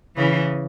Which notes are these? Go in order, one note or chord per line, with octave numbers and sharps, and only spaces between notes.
C#3 E3